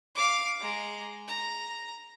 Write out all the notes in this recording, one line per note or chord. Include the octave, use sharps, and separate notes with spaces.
F5 D6
G#3 A#5
A#5